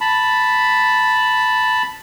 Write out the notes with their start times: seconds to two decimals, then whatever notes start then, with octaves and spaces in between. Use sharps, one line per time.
0.01 A5 B5